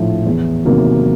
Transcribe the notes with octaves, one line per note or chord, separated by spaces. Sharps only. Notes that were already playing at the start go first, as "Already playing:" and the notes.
Already playing: A#1 A2 F3
E2
C3 D#3 F#3 A#3